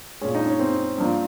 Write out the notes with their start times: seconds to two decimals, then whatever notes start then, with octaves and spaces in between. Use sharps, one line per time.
0.21 A#2 G#3 C#4
0.35 D#4
0.47 C#4
0.60 C4
0.98 G2 F3 A#3